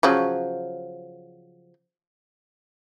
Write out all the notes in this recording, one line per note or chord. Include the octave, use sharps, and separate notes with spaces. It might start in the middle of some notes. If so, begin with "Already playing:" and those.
C#3 F3 F#3